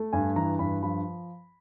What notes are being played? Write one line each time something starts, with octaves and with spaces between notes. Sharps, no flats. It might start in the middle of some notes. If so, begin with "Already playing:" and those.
Already playing: A3
G2 G#5
E3 A#5
G2 B5
F3 B5